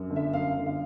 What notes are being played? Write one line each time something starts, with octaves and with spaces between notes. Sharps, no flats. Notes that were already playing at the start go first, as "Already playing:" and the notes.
Already playing: F#2
G1
E5
F#2 F5
G1
F5